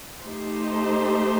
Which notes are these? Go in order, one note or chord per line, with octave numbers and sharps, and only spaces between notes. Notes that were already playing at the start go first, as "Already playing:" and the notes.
A3 D#4 G4 C5